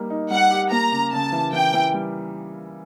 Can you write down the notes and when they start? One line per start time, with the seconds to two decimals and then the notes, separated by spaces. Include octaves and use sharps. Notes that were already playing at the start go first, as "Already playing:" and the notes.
Already playing: G3 A#3 D#4
0.10 D#4
0.30 G3 F#5
0.51 G4
0.71 A#3 A#5
0.92 C#3
1.12 C#3 A5
1.32 E3
1.53 E3 G5
1.74 E3
1.94 G3